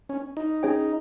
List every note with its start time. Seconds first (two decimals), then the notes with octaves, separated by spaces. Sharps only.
0.09 C#4
0.37 D#4
0.63 C#4 G#4 C#5 G5